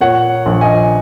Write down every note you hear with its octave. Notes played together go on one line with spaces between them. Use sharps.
A#2 C#5 F#5
A#1
D#5 G#5